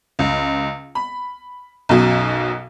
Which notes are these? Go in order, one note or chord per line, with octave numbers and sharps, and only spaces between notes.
C#2
B5
B1 F#2 B2